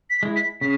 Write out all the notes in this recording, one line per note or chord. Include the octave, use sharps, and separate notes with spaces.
B6
G#3 E4
B6
C#3 B6